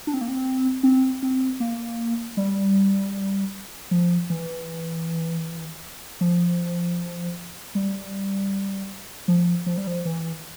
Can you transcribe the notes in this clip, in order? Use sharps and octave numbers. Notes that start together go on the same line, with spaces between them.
D4
C4
A#3
C4
C4
C4
A#3
G3
F3
E3
F3
G3
F3
F3
G3
F3
E3